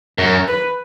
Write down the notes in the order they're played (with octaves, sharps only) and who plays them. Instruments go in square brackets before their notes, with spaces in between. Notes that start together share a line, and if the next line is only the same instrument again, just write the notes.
[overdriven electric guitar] F#2 [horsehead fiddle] A#4
[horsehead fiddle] B4